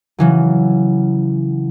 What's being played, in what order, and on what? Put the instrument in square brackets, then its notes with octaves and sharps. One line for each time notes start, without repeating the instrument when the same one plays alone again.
[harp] C#3 E3 F#3